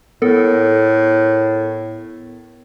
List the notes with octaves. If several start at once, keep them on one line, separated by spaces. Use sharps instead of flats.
A2 B3 A4 A#4